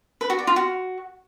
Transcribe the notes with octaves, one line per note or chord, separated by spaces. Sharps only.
B4
F#4
D5
F4
F#4